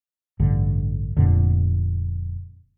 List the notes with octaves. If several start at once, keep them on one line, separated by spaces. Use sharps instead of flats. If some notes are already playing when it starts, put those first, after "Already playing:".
A1 G2 D3
F1 F2 A#2 D3